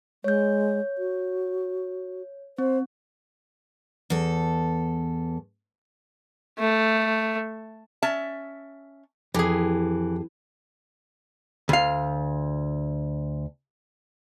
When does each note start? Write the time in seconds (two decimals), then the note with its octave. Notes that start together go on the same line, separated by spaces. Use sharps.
0.24 G#3 C#5 G6
0.98 F#4
2.58 C4 C5
4.10 E2 A4
6.59 A3
8.02 C#4 E5 A5
9.34 F2 E3 G4 G#4
11.69 D2 F5